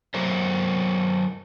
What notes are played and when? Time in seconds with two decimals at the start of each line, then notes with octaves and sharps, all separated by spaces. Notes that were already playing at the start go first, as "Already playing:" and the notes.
0.14 F#3 A#4 C5